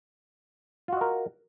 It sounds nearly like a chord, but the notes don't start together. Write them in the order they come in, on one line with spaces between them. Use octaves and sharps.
F4 F#4 D#5 A#4